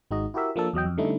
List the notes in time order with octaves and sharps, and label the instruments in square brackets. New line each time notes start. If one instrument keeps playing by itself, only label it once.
[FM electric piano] G#1 G#3 D#4 F#4 D#5
E4 F#4 G4 A#4 E5
F3 A#3 D4 A4
E2 F#3 D#5 G5
F2
D3 G3 A3 C#4 D#4 E4